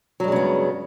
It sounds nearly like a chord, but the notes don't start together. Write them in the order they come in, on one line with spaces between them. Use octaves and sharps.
F#3 G2 G#3 C#3 B3